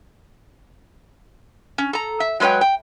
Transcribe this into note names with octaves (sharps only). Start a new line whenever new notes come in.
C#4
A4 A#5
E5
F#3 G#3 B4 C#5 G5
G5